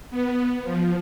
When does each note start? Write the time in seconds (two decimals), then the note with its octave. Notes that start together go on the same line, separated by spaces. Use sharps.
0.10 B3
0.63 F3